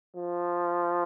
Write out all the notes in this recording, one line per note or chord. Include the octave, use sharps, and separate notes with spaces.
F3